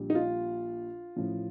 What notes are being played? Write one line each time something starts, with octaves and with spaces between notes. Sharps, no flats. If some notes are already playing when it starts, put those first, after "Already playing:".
Already playing: A#1 A#2 G3
D#4
F4
A1 A2 F3